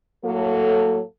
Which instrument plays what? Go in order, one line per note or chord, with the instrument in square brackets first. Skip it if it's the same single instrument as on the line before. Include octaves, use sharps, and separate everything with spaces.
[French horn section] A2 F#3 A#3 A4